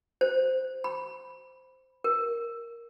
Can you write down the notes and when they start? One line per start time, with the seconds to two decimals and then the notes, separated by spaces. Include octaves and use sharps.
0.21 C5
0.84 B5
2.04 A#4